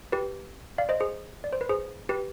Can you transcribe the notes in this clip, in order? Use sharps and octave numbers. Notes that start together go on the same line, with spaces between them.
G4 B4
D5 F5
C5 D#5
G#4 C5
D5
C5
B4
G#4 C5
G4 B4